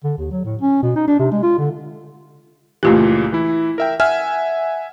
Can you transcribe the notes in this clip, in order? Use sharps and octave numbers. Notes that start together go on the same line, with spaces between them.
D3
D#2
F#3
A2
C#4
B2
D#4
D4
C3
G#3
F4
D3
C#2 A#2 E3 A3 F4 G4
E3 E4
A#4 E5 G5
E5 F#5 G#5 F6